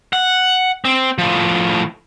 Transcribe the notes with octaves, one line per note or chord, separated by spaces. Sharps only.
F#5
C4
A2 F3